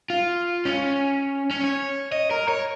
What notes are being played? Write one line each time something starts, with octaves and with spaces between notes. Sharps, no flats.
F4
C#4
C#4
C#5
D#5
A#4
C#5